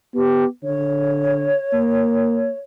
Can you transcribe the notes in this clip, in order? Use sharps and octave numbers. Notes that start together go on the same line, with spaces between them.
B3 G4
D3 C#5
A#3